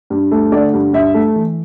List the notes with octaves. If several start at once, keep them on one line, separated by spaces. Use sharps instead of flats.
G2
A3
D3 D5
G2
G2 E5
A3
E3